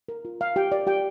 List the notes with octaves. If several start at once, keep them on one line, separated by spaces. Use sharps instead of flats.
A#4
F4
A#4 F5
F4 G4 G5
A#4 D5
F4 G4 G5